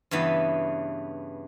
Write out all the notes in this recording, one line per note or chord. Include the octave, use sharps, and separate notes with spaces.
G2 C#3 E3 B3